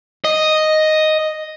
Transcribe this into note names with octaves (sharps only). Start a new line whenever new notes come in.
D#5